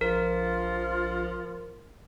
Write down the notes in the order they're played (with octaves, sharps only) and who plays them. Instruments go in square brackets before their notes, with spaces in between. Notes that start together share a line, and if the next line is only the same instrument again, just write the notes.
[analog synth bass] A#1 [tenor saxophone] F3 [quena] F4 [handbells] A#4